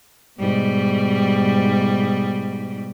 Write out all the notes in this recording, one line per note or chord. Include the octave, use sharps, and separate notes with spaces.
G#2 B2 G3